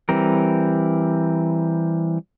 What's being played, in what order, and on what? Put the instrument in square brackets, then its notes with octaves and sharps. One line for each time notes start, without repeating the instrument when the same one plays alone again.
[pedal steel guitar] E3 G3 C4 A#4